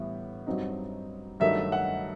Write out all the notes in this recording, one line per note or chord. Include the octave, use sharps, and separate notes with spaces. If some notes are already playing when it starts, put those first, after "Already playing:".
Already playing: A2 E3 G3 B3
G2 F#3 C4 D#4
G2 D#3 F#3 A3 D#4 E5
F#5